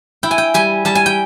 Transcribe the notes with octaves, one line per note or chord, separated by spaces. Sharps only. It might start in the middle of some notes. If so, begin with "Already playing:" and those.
E4 G5
G#5
G5
G3 G#5
G3 A5
G#5
G5